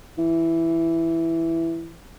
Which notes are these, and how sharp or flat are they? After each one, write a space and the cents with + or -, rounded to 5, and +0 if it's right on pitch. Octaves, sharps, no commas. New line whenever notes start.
E3 +5